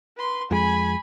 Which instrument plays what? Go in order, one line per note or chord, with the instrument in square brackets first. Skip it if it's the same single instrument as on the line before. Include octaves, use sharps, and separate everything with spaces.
[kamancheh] B4 C6
[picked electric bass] F2 G#3 [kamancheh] G#5 B5